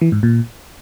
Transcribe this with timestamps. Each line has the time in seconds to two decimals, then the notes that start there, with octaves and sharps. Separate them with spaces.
0.01 E3
0.12 G#2
0.23 A#2